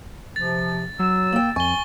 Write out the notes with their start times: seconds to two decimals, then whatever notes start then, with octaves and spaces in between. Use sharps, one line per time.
0.36 C3 F3 A6
0.99 F#3 E6
1.33 A#3 G5
1.56 F2 G#5 C#6 G7